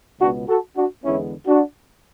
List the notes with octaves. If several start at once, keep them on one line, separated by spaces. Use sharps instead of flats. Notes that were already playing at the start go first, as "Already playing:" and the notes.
C#2 B2 G#3 B3 D4 F#4
F#4 A4
D4 F#4
E2 D3 G#3 B3 C#4 E4
D4 F#4